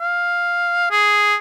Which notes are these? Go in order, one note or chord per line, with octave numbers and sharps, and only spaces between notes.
F5
G#4